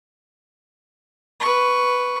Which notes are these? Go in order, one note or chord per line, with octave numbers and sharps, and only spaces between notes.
B4 C#6